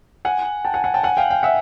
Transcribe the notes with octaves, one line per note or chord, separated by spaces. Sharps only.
F#5 G#5
G5 A5
F#5 G#5
F#5 G#5
G5 A5
F#5 G#5
F5 G5
F5 G5
E5 F#5